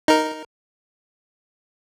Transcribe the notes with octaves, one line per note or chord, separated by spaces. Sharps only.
D#4 A#4